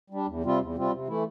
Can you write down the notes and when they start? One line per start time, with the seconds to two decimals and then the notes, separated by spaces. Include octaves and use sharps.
0.10 G3 D4
0.26 E2
0.44 C3 G3 C4 F4
0.60 E2
0.75 C3 G3 C4 F4
0.92 C3
1.07 E3 A3 E4